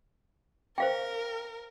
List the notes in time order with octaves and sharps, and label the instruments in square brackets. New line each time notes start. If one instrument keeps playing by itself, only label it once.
[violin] A#4 [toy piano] C5 F5 G5